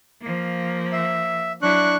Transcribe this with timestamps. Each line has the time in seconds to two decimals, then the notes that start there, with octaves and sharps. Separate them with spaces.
0.21 F3 A#3
0.93 E5
1.62 F#3 D4 E4 C#6 F#6